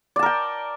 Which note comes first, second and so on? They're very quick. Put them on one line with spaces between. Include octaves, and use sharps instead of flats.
D5 A5 A#4 G5